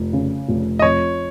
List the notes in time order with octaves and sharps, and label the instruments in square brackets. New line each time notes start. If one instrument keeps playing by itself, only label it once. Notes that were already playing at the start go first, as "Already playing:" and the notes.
Already playing: [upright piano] F1
C#3
F1
[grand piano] D#5
[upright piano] F2 [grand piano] C#5